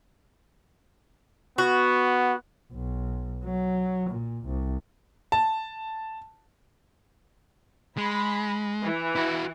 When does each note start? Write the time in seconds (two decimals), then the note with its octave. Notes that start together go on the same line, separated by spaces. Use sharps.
1.58 B3 F#4
2.73 B1
3.44 F#3
4.10 A#2
4.45 C2
5.32 A5
7.97 G#3 B5
8.82 E3
9.15 E4 F#4